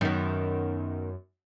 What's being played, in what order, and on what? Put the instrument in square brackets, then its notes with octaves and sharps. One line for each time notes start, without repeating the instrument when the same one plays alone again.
[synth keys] F#2 [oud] D#3 B3